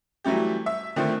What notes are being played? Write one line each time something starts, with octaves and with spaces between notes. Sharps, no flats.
E3 F#3 G3 A3 G4
E5
D3 D#3 F3 A3 C4